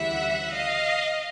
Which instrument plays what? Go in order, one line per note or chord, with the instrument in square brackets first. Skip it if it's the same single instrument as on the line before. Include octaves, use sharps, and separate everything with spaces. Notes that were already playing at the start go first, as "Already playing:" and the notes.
Already playing: [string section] D2 C#3 E3 G3 E5 F#5
D#5 F5